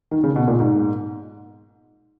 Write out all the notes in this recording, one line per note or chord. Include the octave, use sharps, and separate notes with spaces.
D#3
C#3
B2
A#2
G#2